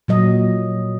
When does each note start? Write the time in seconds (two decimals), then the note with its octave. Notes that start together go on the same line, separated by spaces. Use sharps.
0.08 A#2 F#3 D#5